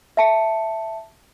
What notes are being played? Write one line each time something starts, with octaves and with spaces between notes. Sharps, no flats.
E5 A5 C#7